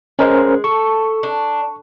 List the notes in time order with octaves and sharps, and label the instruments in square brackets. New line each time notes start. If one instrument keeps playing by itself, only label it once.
[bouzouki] G#3 [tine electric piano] C#4 A#4 C5
[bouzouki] A4 [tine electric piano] C#6
[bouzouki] D4